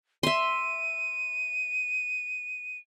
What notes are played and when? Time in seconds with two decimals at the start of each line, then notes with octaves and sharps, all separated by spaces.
0.23 E5 C6 D#7